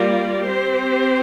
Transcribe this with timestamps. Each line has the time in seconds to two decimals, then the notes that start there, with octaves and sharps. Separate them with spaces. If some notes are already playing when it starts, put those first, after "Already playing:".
Already playing: G3 A#3 F4 A#4 D5
0.46 C4 G4 C5